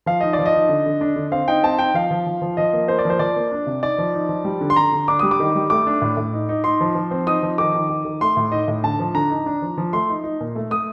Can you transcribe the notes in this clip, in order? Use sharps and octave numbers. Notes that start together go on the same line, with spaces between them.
F3 F5
D#4 D#5
D5
F3
D#5
D#4
D3
D3
D4
D3
C4 F5
D#4 G5
C4 A5
D#4 G5
F3 F5
F3
F3
F3
F3 D#5
A#3
A#3 C5
D5
F3 C5
F3 D5
A#3
D4
C3
D#4 D5
F3
D#4
F3
G3
D3
C6
D3 A#5
D3
D4 D6
G3 D#6
D6
D#3
G3
A3 D6
D4
A2
A2
D#4
D#4
D#4 C6
F3
F3
C4
D#4 D#6
F3
D#3 D6
D#3
D#3
D#3
A3 C6
A2
D#4 D#5
A2
D3 A5
F3
D3 A#5
D#4
D4
F3
F3
A3 C6
D#4
D#4
A#2
A3
A3 D#6